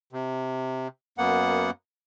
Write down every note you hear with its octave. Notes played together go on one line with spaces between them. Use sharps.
C3
F#2 A#3 B3 F#5